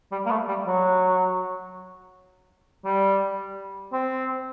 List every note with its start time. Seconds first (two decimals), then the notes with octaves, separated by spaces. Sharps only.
0.12 G3
0.26 A#3
0.31 A3
0.48 G3
0.67 F#3
2.85 G3
3.93 C4